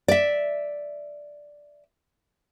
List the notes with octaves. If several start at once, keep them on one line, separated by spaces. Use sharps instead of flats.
D5 E5